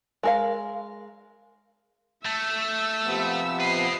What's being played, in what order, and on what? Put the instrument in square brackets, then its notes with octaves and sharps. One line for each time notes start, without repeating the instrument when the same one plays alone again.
[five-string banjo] G#3 A#4 F5
[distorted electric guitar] A3 [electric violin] E5 E6
[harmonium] C3 F3 B3
[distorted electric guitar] B4 D#5 [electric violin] C7